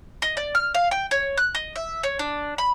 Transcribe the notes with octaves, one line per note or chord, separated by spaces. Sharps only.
D#5
D5
F6
F5
G5
C#5
F#6
D#5
E5
C#5
D4
B5